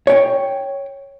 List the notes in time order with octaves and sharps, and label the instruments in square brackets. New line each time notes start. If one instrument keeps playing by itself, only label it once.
[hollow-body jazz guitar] C#5 G5